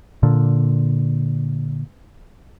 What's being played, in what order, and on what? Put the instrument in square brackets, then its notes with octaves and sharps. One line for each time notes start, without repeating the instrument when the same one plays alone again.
[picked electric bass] A#2 D3